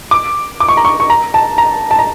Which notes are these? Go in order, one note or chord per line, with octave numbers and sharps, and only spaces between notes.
D6
D6
C#6
A#5
C#6
C#6
A#5
A5
A#5
A5
A#5